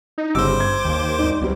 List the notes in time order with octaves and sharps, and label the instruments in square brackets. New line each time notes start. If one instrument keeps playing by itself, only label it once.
[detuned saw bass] D#4
[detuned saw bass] G1 [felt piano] C#3 G3 E6 [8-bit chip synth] C5 D6
[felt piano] G#6
[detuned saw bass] D#2
[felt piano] G#1 D#4
[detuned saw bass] C#2 [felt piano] F#3 G3 C4